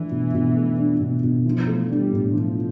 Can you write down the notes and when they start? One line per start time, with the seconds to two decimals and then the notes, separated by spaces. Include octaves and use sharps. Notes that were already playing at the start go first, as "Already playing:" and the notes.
Already playing: E3 A3 D4
0.11 B2
0.34 B2
0.56 A3
0.78 D4
1.00 B2
1.23 B2
1.45 E3 F3
1.67 A3
1.90 G3 D4
2.12 A2
2.34 E3 F3